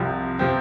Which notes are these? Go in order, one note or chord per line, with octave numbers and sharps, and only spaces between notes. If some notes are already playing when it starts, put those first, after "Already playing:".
Already playing: C2 C3 F3 C4
C3 F3 C4